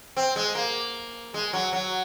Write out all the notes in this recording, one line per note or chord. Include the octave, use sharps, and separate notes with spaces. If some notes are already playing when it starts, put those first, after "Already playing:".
C4
G#3
A#3
G#3
F#3
F#3